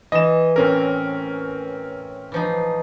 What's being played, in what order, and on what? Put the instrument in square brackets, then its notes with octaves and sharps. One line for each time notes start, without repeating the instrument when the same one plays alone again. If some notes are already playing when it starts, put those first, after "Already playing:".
[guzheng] E3 [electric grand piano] D#5 E7
[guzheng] A2 [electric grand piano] C4 C#4 A#4
[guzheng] E3 F3 D#4